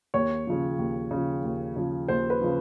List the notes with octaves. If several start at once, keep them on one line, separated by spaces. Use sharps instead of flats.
D#2 C#5
C#3 F3
D#2
C#3 F3
D#2
C#3 F3
D#2 C5
B4
C#3 F3